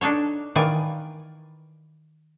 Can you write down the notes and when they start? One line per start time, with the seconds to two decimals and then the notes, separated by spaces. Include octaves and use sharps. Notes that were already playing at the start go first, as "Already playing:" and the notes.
0.01 D4 D#4 A4 C#5
0.56 D#3 E3 F4 D5 G#5